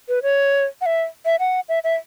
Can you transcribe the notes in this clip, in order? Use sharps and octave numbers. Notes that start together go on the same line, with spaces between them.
B4
C#5
F#5
E5
E5
F#5
E5
E5